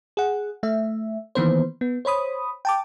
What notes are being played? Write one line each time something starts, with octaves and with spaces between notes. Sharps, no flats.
G#4 F#5
A3 E5
D#3 E3 A#3 B3 B4 C5
B3
C5 C#5 B5 D#6
G5 A5 D6